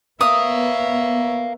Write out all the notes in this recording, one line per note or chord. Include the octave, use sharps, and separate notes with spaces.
B3 A#4 C#5 E5 F5 D#6